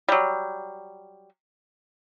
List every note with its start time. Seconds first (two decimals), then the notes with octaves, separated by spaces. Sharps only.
0.09 F#3 G3